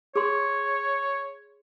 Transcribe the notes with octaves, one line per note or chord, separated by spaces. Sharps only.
G#4 C#5 C6